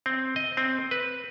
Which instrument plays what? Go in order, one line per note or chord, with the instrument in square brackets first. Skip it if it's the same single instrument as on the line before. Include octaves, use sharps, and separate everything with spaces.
[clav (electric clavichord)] C4
D#5
C4
B4